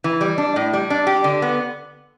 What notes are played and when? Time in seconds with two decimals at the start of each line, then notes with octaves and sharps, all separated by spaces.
0.04 E3
0.21 G3
0.38 D4
0.56 A2
0.73 G3
0.90 D4
1.07 G4
1.24 D3
1.42 B3